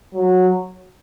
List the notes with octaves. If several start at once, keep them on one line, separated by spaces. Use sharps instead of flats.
F#3